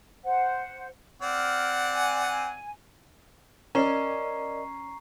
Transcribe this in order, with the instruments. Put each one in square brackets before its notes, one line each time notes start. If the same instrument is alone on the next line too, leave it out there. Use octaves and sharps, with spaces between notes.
[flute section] C5 F#5
[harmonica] C4 D5 F#5 [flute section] F6
[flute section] G#5
[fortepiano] C#4 [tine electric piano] A#4 D5 D#5 [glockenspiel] A#5 C#6 C7